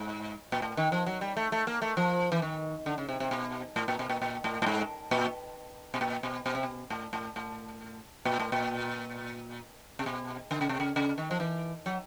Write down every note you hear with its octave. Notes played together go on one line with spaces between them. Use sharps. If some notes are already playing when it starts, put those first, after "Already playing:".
Already playing: G#2
A#2
A2
D#3
F3
F#3
G3
A3
A3
A#3
A3
F3
E3
D#3
D3
C#3
C3
C3
B2
A2
A#2
B2
A#2
A#2
A2
A2
G#2
A#2
B2
A#2
B2
B2
C3
B2
A2
A2
A2
A#2
A2
A#2
C3
B2
D3
C#3
C3
C#3
C#3
D#3
F3
E3
F#3